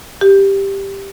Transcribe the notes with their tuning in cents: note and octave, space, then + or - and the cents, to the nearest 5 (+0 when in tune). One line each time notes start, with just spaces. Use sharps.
G4 +5